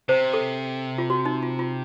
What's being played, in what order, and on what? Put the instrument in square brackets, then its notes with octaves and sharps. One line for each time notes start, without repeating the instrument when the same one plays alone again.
[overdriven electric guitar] C3 [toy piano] C5
[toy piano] A4
F4
F#4
D#4
F4
F4